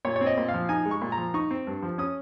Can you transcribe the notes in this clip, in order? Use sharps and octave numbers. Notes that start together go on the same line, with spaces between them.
A#2 C#5
C#5
C4
D#5
A#2
F5
F3
D#4 G#5
G#3
C#6
A#2
A#5
F3
D#4 C#6
C4
G2
F3
C#4 D#6